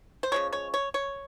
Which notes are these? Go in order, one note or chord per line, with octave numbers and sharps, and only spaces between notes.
C5
C#3 F3 G#3 C#5
C#5
C#5
C#5